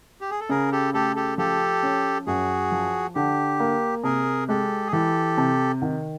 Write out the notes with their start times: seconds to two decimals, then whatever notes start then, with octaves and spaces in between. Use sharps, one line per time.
0.21 G4
0.30 G#4
0.41 A4
0.49 C#3 G#4 A#4
0.72 G4 A4
0.94 A3 G4 A4
1.16 G4 A4
1.38 F3 G4 A4
1.83 C#4
2.27 F#2 F#4 G#4
2.72 F3
3.15 D3 G4
3.60 A#3
4.04 C3 G#4 A#4
4.49 G#3 G4 A4
4.87 G#4
4.92 E3 G4 A4
5.38 C3
5.82 D#3